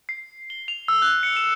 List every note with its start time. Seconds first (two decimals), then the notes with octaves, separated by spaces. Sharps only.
0.09 C7
0.50 G7
0.68 F7
0.88 E6
1.02 F#6
1.23 C#7
1.37 E7